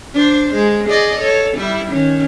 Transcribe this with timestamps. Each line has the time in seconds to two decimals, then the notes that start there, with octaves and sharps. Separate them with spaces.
0.14 D4 C5
0.55 G#3
0.89 G#4 D5 D#5
1.18 A4 C#5
1.57 G3 E4
1.91 D#3 C#4